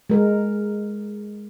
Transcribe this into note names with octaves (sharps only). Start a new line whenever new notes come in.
G#3 A#4